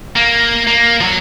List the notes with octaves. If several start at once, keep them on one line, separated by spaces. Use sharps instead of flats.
A#3
A#3
F3 F#3